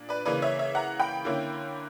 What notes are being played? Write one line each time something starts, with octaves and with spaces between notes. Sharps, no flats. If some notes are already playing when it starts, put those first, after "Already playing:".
Already playing: A#2 D4
B4 D5
C#3 E3 A#3 B4 D5
C#5 E5
C#5 E5
F#5 A#5
G5 B5
D3 A#3 C#4 E4